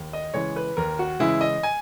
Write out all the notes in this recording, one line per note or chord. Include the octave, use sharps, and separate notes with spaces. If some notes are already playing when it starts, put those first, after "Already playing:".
Already playing: D#2
D#5
C#3 E3 G#3 C#5
B4
D#2 A#4
F#4
C#3 E3 G#3 E4
D#5
G#5